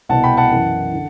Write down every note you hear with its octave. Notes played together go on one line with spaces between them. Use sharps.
C2 B2 F#5 A5
G5 B5
F#5 A5
F#2 E3
D3